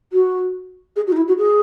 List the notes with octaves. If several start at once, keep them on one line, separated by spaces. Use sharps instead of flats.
F#4
G#4
F#4
D#4
E4
F#4
G#4